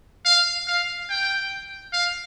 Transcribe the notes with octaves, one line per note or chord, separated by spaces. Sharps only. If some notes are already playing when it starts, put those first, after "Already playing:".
F5
F5
G5
F5